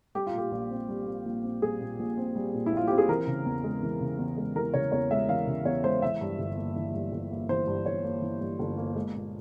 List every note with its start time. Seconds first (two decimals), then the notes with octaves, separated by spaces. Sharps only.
0.15 G3 G4
0.27 F4
0.33 A#2 G4
0.51 A#1
0.71 C4
0.89 G3
1.07 A#2
1.26 A#1
1.44 C4
1.62 G3 G#4
1.80 A#2
1.99 A#1
2.17 C4
2.36 G3
2.54 A#2
2.66 E4
2.72 A#1 F4
2.87 C4 G4
2.98 G#4
3.09 E3 A#4
3.27 C#3
3.46 E2
3.64 G#3
3.83 E3
4.01 C#3
4.18 E2
4.37 G#3
4.55 E3 A#4
4.74 C#3 C#5
4.92 E2 C#5
5.11 G#3 E5
5.29 E3 F5
5.47 C#3
5.65 E2 C#5
5.84 G#3 C5
6.02 E3 E5
6.21 G2
6.39 G1
6.57 A#3
6.76 E3
6.94 G2
7.12 G1
7.31 A#3
7.49 E3 C5
7.67 G2
7.86 G1 C#5
8.04 A#3
8.22 E3
8.41 G2
8.59 G1
8.78 A#3
8.95 G#3
9.14 A#2